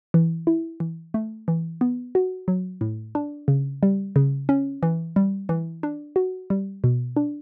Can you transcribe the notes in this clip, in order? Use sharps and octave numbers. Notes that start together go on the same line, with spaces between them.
E3
E4
E3
A3
E3
B3
F#4
F#3
A2
D4
C#3
G3
C#3
C#4
E3
G3
E3
D4
F#4
G3
B2
D4